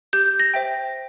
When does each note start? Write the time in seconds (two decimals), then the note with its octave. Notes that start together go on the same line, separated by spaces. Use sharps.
0.13 G4 G6
0.39 A#6
0.54 C5 E5 G5